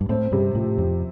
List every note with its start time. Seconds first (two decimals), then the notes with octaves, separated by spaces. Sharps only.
0.01 G2
0.09 A2 C4
0.32 G2 C3
0.55 A2 F3
0.78 F2 F3